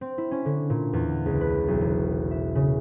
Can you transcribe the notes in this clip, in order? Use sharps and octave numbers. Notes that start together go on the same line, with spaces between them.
C4
E4
C#4
D3
A#2
E2
C#2
B4
B1
E1
E5
C#3